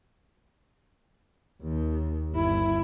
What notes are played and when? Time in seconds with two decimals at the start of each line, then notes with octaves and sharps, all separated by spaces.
1.63 D#2
2.32 G1 E4